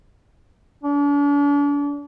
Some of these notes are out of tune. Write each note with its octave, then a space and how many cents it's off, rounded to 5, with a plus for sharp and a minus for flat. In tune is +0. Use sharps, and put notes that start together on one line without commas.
D4 -40